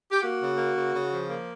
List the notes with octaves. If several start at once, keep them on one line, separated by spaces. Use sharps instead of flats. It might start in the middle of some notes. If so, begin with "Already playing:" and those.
G4
A#3 F#4
C#3
A#3
C#3
C#3
F3
A#3